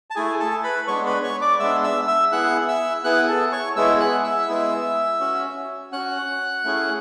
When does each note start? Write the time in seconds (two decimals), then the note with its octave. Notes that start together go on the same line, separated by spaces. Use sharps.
0.10 A5
0.16 A3 E4 G#4 G#5
0.40 A4 A5
0.64 B4 B5
0.87 G#3 B3 D4 C#5 C#6
1.06 B4 B5
1.23 C#5 C#6
1.41 D5 D6
1.60 G#3 B3 D4 E5 E6
1.84 E5 E6
2.08 E5 E6
2.32 B3 E4 G#4 F#5 F#6
2.68 E5 E6
3.04 B3 E4 G#4 F#5 F#6
3.28 A4 A5
3.52 C#5 C#6
3.76 G#3 B3 E4 G#4 E5 E6
4.00 F#5 F#6
4.24 E5 E6
4.48 G#3 B3 E4 G#4
5.20 C#4 F#4
5.92 C#4 F#4 F#5 F#6
6.64 A3 C#4 E4 G#4